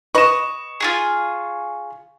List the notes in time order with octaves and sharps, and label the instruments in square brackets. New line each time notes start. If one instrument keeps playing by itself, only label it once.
[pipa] B4 D#5 [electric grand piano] C#6 E7
[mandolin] F4 F#4 G#4